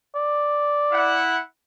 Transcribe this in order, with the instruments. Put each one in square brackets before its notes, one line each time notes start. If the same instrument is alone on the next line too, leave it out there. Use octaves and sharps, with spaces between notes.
[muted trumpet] D5
[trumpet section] E4 F#5